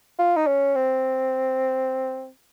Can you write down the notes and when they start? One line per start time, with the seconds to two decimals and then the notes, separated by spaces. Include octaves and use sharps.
0.19 F4
0.37 D#4
0.47 C#4
0.75 C4